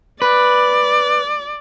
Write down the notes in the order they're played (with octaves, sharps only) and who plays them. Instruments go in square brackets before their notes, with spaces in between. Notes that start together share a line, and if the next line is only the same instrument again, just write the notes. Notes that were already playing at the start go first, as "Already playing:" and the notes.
[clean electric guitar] B4 [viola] D5